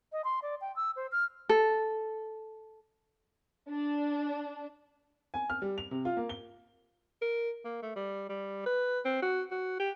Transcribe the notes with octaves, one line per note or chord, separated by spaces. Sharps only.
D#5
C6
D5
G5
E6
C5
F6
A4
D4
G#5
F6
G3
F7
C3
F4
A#3
G7
A#4
A#3
A3
G3
G3
B4
C4
F#4
F#4
G4